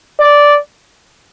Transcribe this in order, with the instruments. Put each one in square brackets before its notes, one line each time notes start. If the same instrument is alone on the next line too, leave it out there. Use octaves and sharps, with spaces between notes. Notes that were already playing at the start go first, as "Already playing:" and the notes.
[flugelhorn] D5